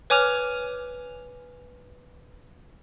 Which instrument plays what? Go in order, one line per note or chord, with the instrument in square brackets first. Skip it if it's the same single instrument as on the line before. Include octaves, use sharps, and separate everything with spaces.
[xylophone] B4 C#5 G#5 D6 F6 F7